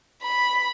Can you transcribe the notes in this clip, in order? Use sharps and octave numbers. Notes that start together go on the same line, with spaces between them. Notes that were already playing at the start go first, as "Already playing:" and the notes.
B5